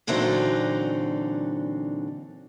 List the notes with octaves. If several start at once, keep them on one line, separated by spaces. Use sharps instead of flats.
A#2 D3 E3 F#3 C4 D#4